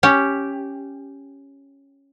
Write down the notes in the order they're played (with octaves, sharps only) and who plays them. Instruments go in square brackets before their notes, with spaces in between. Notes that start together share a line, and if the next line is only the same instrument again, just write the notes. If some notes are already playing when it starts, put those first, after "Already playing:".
[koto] C#4 G4